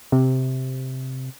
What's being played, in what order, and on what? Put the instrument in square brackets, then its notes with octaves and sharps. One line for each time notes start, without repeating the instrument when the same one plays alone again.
[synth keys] C3